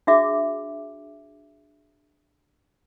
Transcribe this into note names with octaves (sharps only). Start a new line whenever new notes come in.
D4 F#4 G#4 E5 D6